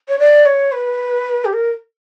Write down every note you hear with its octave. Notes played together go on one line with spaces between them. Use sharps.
C#5
D5
C#5
B4
G4
A#4